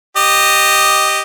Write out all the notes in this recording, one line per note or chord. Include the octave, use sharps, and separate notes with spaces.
G4 D#5